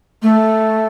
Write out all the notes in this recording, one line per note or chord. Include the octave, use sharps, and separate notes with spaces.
A3